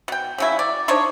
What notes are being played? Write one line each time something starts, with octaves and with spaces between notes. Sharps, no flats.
B2 G5
C#3 F#3 E4
D5
D4 D#4 C5 C#5